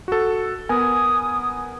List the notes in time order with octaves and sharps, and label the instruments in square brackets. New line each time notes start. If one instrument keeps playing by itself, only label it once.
[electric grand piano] F#4 A4
[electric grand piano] B3 A#4 G#5 [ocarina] D#6